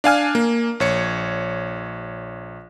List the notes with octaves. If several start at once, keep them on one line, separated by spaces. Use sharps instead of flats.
D4 F5 G#5 F6
A#3
A#1 C#5 C#7